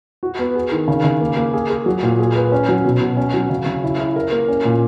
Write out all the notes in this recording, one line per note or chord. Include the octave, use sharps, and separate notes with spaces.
F#4
B3
G#4
D#3
C#3
C#3
A#3
A#3
G#4
G#4
F#3
A#2
G#4
B4
C#4
F#3
B2
B2
C#4
F#3
C#3
C#3
E4
E4
A#4
A#3
C#4
A#2